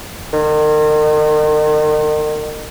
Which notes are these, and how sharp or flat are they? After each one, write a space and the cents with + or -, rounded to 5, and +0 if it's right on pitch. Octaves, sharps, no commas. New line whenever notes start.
D#3 -40